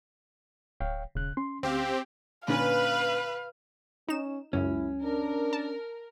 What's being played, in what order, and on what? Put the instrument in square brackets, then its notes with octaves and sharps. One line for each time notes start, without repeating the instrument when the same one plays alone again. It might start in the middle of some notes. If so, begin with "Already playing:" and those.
[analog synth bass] D1 [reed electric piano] C#5 F5 G5
[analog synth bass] E1 [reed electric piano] C#3 F#6
[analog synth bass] C#4 [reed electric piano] C6
[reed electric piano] D2 F5 [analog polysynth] C4 G4
[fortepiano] A#2 D3 C#4 [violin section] B4 [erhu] F5
[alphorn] C#4 [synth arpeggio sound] D#4 E7
[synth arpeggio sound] C#2 F#2 [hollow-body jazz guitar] C#4 [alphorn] E4
[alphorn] D4 [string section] A#4
[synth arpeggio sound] A5